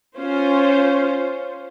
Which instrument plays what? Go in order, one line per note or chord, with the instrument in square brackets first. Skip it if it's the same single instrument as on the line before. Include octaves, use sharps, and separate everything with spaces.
[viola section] C#4 F4 C5